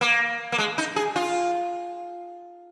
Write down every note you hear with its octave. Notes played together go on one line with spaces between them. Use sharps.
A#3
A#3
G#3
D#4
G#4
F4